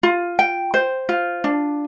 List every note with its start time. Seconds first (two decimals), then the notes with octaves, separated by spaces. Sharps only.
0.03 F4
0.39 G5
0.74 C5
1.09 F4
1.44 D4